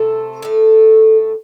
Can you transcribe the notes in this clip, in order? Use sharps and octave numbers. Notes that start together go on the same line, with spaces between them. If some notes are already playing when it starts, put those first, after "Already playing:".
Already playing: C3 A3 A4
A2 A3